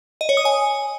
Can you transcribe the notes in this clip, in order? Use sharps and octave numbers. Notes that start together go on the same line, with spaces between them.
D#5
C#5
D#6
G#5